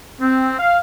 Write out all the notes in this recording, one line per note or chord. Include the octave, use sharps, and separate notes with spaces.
C4
F5